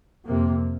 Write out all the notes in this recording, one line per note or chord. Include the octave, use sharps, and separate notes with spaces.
F2 C3 A#3